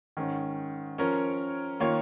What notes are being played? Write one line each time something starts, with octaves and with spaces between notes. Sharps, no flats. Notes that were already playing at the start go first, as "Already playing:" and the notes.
G#2 D#3 C#4
F3 C#4 A#4 C#5
D#3 A#3 F4 C#5